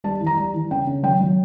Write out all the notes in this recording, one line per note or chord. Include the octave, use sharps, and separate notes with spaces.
G3 A5
E3
A#5
G3
E3
C#3 G5
C#3
F#3 G5
F#3